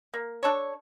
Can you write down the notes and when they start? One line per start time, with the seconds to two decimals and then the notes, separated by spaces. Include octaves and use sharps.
0.14 A#3
0.43 D4 A4 C#5